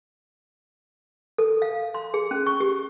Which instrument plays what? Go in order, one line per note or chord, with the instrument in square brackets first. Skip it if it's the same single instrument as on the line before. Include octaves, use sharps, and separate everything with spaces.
[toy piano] A4
F5
C6
G#4
C#4
C#6
G4